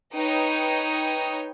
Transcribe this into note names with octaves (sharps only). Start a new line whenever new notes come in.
D#4 B4 C#5 G5 D#6